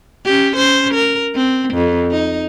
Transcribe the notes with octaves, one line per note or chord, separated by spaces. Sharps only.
C#4 G4
C#4 C5
A#4
C4
F2
D#4